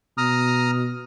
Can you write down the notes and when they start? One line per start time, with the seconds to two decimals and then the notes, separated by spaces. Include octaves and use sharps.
0.18 B2 A#5 D#6 F6